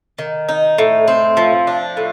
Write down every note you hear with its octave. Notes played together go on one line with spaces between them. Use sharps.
D#3
D#4
A2
C4
F3
D4
A2